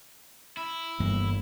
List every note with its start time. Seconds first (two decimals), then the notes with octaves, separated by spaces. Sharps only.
0.57 E4
1.00 G1 G2 E3 A#3